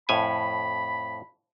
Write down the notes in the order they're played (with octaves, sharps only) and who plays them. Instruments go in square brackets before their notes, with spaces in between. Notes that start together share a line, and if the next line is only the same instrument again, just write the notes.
[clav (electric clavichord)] F2 A2 G#5 [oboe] B5